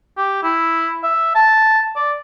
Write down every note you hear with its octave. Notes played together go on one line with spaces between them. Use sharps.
G4
E4
E5
A5
D5